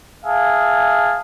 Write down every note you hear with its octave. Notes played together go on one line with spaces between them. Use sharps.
G#4 E5 F5 A5